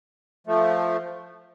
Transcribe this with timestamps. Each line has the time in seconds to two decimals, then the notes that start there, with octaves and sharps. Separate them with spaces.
0.47 F3 A3